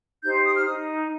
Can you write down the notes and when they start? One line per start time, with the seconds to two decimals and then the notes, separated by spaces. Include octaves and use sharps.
0.24 D#4 G4 C5 G6
0.35 C6
0.45 D#6
0.56 F6
0.66 D#4 D#6